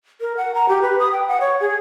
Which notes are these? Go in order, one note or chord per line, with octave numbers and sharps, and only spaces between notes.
A#4
F#5
A#5
G4
B4
D#6
G5
F#5
C#5
G#4